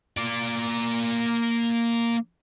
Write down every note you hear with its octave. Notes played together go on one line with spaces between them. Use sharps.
A#3 D5